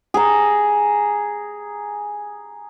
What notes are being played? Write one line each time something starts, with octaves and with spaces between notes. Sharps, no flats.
G#4 A#5